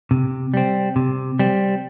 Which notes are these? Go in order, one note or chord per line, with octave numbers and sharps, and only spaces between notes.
C3
G3 C4
C3
G3 C4